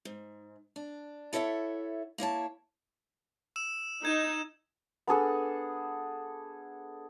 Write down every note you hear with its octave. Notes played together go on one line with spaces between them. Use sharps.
G#2
D4
E4 A4 C#5 D#5 E5 F#5
A#3 E4 C#5 A5
E6 E7
D#4 G#6 E7
B3 D4 G#4 A4